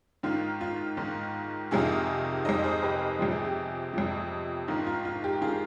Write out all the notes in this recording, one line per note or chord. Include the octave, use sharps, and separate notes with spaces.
G#2 D#3 F4
F4
G#2 D#3
F2 C3 D#3 F4 G#4
F2 C3 D#3 C5 D#5
G#4 C5
G4 B4
F2 C3 F3 G4
G#4
G4
F2 C3 F3
G#2 D#3 F4
F4
F4
G4
D#3 F4 G#4